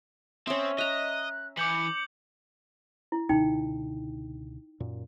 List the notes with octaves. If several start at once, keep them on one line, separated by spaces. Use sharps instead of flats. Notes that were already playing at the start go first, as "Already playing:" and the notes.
C4 C#4 E5 D#6
D#5 E5 A#5 F#6
E3 D6 G6 C#7 F#7
E4
C#2 B2 D3 D#4 G5
F#2 A#2